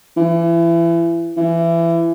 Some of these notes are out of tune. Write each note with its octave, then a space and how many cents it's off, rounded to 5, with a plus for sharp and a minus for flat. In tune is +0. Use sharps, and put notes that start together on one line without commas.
E3 +30
E3 +25